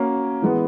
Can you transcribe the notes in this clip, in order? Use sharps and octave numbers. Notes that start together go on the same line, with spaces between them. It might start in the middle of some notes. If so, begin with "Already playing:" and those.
Already playing: A#3 C#4 F#4 A#4 C#5
E3 G#3 B3